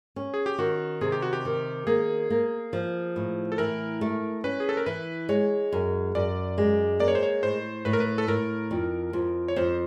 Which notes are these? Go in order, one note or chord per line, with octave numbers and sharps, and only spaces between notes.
C#4
G#4
G4
D#3 F#4
C3 G#4
G4
F#4
G4
D#3
A#3 G#4
A#3
F3
A2
A4
E3 A#4
A3
C#4 B4
G#4
A4
A#4
E3 B4
G#3 C#5
F#2
F#2 D5
G#3
A#3 D5
C#5
C5
C#5
A2 C5
A2 B4
A#4
B4
A4
A2 A#4
F2
F2
C#5
F2 C5